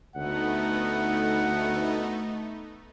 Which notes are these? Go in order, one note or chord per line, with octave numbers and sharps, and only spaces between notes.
D2 A3 B3 D#4 F#5